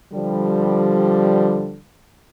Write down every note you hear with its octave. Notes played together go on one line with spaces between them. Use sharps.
D3 F3 G3